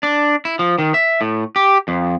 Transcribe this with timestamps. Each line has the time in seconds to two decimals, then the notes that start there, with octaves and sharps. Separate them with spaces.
0.03 D4
0.45 E4
0.59 F3
0.79 D#3
0.94 E5
1.21 A2
1.56 G4
1.88 F2